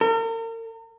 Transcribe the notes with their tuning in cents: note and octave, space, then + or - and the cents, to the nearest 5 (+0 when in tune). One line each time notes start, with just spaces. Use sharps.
A#4 -40